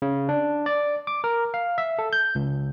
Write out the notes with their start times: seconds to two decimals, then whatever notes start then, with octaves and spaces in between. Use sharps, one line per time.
0.02 C#3
0.29 D4
0.66 D5
1.07 D6
1.24 A#4
1.54 F5
1.78 E5
1.99 A4
2.13 G6
2.35 C#2